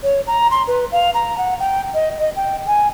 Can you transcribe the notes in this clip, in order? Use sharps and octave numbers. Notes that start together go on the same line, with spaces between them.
C#5
A#5
C6
B4
F5
A#5
F#5
G5
D#5
D#5
G5
G#5